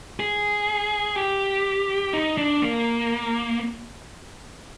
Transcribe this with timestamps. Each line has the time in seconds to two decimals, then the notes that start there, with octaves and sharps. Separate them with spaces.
0.20 G#4
1.16 G4
2.13 D#4
2.38 D4
2.62 A#3